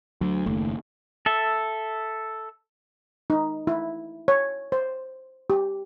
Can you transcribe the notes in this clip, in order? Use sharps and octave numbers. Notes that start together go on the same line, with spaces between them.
D2 F#3
F#1 D#2 A3
A4 E5
D#4
E4
C#5
C5
G4